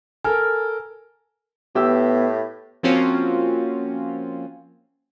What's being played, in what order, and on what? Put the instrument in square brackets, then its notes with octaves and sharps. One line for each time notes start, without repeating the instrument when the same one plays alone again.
[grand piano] A4 A#4 [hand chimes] G#5 F6
[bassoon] A2 [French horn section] B3 [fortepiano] G4 E6
[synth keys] F3 A#3 C4 C#4 F4 F#4